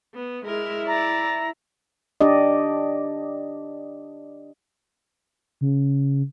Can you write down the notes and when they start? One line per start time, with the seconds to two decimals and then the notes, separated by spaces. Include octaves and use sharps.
0.14 B3
0.45 G#3 E4 A#4
0.87 D5 A#5
2.21 D4 G4 D5 D#5
5.61 C#3